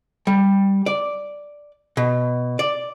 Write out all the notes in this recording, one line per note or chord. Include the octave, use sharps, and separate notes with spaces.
G3
D5
B2
D5